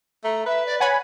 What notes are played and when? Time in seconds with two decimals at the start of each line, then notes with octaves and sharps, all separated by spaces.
0.24 A3 A#5
0.46 B4 E5
0.66 D5
0.80 C#5 F#5 G#5 B5